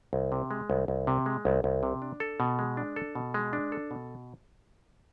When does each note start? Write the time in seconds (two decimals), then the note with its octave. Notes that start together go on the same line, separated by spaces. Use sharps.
0.13 C2
0.32 C3
0.51 G#3
0.70 C2
0.88 C2
1.07 C3
1.26 G#3
1.45 C2
1.64 C2
1.83 C3
2.02 D4
2.20 A4
2.40 B2
2.59 G#3
2.77 D4
2.96 A4
3.15 B2
3.34 G#3
3.53 D4
3.72 A4
3.91 B2